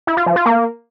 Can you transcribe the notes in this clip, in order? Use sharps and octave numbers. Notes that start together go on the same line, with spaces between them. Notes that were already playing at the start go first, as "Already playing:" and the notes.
E4
F4
F3
F4
A#3